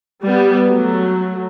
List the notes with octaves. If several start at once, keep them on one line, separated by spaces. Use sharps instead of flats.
G3 B3
F#3 A3